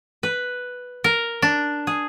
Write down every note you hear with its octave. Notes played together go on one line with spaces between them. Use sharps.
B4
A#4
D4
G#4